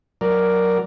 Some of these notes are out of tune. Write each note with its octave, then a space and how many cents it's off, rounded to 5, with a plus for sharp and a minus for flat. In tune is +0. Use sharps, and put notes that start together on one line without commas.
F#3 +0 A#4 +0 D5 +0